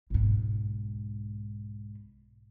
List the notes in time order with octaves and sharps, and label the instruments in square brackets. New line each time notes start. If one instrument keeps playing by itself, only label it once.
[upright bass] B1 G#2